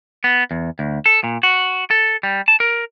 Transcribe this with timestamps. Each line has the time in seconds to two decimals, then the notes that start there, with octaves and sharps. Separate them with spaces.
0.24 B3
0.51 E2
0.79 D2
1.06 A4
1.24 A#2
1.43 F#4
1.91 A4
2.23 G3
2.48 A5
2.60 A#4